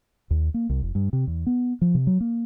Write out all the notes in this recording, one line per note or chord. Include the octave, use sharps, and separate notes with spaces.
D#2
A#3
C2
F1
G2
C3
E2
B3
F3
C3
F#3
A#3